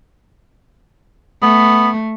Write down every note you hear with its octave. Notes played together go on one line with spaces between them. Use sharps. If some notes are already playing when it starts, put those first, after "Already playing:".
A3 B3